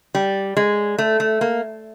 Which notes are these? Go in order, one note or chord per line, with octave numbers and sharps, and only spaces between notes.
G3
G#3
A3
A3
A#3